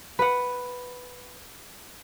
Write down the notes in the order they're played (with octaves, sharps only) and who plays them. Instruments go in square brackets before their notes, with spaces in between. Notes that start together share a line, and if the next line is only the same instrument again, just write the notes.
[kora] B4 F#5